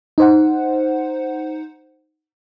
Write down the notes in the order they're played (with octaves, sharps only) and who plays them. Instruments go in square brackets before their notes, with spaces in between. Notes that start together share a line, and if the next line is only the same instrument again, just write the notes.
[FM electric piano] D#4 C5 F#5